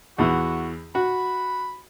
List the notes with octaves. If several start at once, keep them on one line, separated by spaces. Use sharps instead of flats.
E2 E3 F#4
F#4 B5